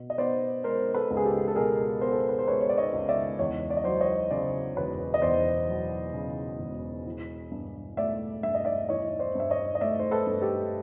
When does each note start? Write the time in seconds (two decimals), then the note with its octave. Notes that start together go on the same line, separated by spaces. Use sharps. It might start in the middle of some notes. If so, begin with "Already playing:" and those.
Already playing: B2
0.10 D#5
0.18 B3 C5 D5
0.64 G#3 A#4 C5
0.95 A4 B4
1.11 C#2
1.17 G#4
1.25 G4 A4
1.48 A4
1.56 B2 G#4 A#4
2.01 B3 A#4 C5
2.12 A4
2.20 A#4
2.29 B4
2.39 C5
2.47 G#3 B4 C#5
2.61 C#5
2.69 D5
2.77 C#5 D#5
2.93 C#2
3.09 D5 E5
3.39 E2 C#5 D#5
3.70 D5
3.77 D#5
3.84 F#3 C5 D5
4.01 C#5 D#5
4.31 C#3 C5 D5
4.76 E1 B4 C#5
5.14 D#5
5.22 E2 C5 D5
5.69 F#3
6.14 C#3
6.59 E1
7.06 E3
7.52 G2
7.97 A3 D5 E5
8.43 G2 E5
8.55 D#5
8.65 D5 E5
8.89 E3 C#5 D#5
9.19 C5 D5
9.35 G2 E5
9.50 C#5 D#5
9.75 D#5
9.81 A3 D5 E5
9.99 C5
10.11 A4 B4
10.27 G2
10.42 G4 A4